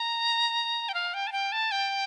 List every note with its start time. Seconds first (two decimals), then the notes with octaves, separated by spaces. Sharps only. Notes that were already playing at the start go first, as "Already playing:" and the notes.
Already playing: A#5
0.89 G5
0.94 F5
1.14 G5
1.27 A5
1.32 G5
1.52 A5
1.71 G5